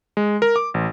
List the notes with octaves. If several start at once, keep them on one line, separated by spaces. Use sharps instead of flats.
G#3
A#4
D6
A1